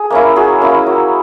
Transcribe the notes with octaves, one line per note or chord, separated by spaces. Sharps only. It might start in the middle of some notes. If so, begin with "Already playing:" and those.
Already playing: G#4
A#3 C#4 E4
F#3 G#4
A#3 C#4 E4
F#3